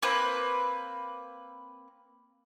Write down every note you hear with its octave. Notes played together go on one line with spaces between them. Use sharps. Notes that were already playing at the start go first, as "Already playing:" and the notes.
A#3 C4 B4 F#6